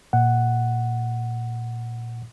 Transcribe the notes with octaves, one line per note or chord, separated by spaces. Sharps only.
A#2 F#5